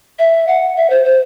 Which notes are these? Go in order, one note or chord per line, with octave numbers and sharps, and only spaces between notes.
E5
F#5
E5
C5
C5